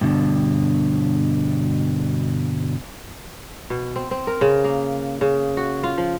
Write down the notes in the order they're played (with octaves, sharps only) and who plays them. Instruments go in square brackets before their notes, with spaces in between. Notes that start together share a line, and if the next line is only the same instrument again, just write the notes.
[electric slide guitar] G2 B2 D3
[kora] B2
C4
C4
A#4
C#3
A#3
C#3
F#4
F4
F3